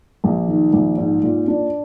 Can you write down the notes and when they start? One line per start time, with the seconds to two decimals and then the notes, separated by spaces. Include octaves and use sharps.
0.24 A#1
0.48 D#3
0.73 A#1
0.97 G#2
1.23 A#2
1.48 D4